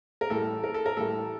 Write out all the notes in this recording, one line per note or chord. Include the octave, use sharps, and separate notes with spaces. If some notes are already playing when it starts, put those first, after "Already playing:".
A#4
A2 E3 G3 A4
A#4
A4
A#4
A2 E3 G3 A4